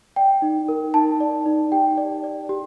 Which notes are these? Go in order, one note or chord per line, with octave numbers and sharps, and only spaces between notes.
D5 G5
D#4
A#4
D#4 A5
D5
D#4
G4 G5
D5
D5
G4